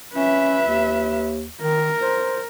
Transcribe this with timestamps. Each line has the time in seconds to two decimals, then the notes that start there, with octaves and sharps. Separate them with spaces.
0.15 C#4 B4 E5
0.67 D#2
1.62 D#3 A#4
2.02 C5